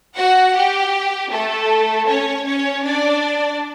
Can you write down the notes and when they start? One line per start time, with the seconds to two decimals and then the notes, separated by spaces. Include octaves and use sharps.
0.16 F#4 F#5
0.55 G4
1.31 A3 A4
2.08 C#4 C#5
2.46 C#4 C#5
2.85 D4 D5